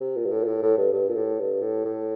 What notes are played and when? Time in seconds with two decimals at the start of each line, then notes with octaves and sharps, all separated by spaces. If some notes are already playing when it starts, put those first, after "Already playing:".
0.01 C3
0.16 A#2
0.25 G2
0.31 A2
0.43 A#2
0.47 A2
0.63 A2
0.78 G2
0.93 G2
1.09 A#2
1.16 A2
1.39 G2
1.62 A2
1.85 A2